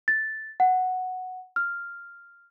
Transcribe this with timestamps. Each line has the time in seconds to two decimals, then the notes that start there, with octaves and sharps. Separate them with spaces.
0.08 A6
0.60 F#5
1.56 F6